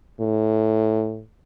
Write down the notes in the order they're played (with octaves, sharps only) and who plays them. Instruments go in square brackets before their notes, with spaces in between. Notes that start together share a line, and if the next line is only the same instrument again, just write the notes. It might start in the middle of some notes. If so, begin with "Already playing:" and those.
[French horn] A2